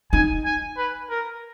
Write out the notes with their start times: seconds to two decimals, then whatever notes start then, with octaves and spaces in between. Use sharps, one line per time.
0.12 D#4 G#5
0.45 G#5
0.77 B4
1.10 A#4